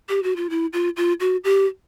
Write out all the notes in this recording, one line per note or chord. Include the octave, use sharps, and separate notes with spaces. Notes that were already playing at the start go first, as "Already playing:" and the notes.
G4
F#4
F4
E4
F4
F4
F#4
G4